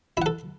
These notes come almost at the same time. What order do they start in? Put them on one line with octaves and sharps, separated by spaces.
E4 F#5 A4